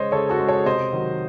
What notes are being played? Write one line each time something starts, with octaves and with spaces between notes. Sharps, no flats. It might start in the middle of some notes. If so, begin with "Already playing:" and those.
Already playing: C#3 G#3 C5 C#5 D#5
C#3 A4 C#5
F#4 A4
G#3
A4 C#5
C3 C5 D#5
D#3 F#3